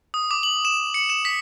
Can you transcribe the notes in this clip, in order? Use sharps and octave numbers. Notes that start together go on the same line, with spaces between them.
D#6
D6
F#7
E7
C#7
E7
B6